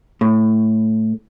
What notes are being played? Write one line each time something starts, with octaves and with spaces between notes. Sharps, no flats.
A2